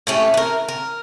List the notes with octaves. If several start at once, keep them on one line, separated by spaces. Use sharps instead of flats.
A2 A3 C#4 G4
A#4 B4
A#4